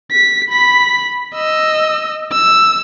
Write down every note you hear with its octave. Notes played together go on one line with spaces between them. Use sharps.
B6
B5 B6
D#5 E6
E6